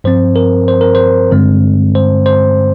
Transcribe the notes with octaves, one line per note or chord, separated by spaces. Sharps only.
G2 F3 C4 C5
A#4
C5
A#4
C5
G2 D3 G#3 C4
C5
C5